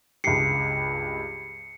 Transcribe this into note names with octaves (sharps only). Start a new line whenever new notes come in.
C#2 G2 G4 C7 C#7